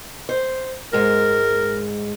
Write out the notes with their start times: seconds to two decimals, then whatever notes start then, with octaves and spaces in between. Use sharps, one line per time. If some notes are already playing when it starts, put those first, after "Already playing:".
0.29 C5
0.93 G#2 G#3 A#4